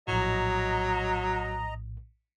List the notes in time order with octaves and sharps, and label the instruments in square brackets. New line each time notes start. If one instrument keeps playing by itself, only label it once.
[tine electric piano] A#1 A2 [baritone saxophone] F#3 [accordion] D#5 A#5